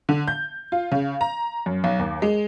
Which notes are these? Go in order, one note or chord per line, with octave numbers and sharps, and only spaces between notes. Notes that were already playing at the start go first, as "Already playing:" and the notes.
D3
G6
F4
C#3
A#5
F#2
B1
D#2
G#3